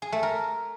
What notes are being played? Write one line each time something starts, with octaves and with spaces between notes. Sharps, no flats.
G#4
A3
A#4